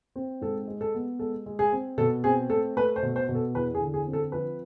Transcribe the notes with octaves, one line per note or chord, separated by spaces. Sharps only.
C4
G#2 A4
G#3
A4
B3
G#3 A4
G#3
G#4
C4
B2 A4
C4 G#4
A3 A4
A3 B4
C5
B2
C5
B2
A4
E2 B4
G#4
D3
G#4
C4
A4
F3 B4